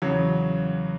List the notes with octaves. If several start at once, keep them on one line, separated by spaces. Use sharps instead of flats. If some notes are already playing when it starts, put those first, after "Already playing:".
E2 C#3 F#3